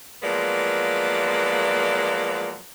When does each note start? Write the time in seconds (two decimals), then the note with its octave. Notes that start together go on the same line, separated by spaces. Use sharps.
0.23 F3 F#3 G#3 A#3 B3 D5